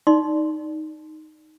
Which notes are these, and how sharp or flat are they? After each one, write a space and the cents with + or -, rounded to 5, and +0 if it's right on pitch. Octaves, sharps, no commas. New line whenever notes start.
D#4 +0 D5 +0 C6 +0